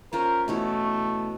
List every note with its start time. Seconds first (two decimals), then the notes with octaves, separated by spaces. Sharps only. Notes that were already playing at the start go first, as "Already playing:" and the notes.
0.13 C#4 F4 A#4 C5
0.48 B2 E3 A3 C#5